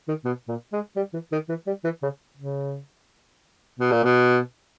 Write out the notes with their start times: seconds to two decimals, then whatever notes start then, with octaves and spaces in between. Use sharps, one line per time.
0.08 D#3
0.25 B2
0.48 A#2
0.72 G#3
0.96 G3
1.13 E3
1.32 D#3
1.49 E3
1.67 G3
1.84 E3
2.03 C#3
2.37 C#3
3.79 B2
3.91 A#2
4.04 B2